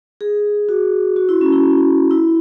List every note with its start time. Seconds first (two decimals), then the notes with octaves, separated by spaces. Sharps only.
0.21 G#4
0.69 F#4
1.16 F#4
1.29 E4
1.41 C#4
1.52 E4
2.11 E4